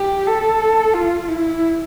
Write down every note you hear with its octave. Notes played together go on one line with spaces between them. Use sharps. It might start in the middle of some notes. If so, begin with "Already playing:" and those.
Already playing: G4
A4
F4
E4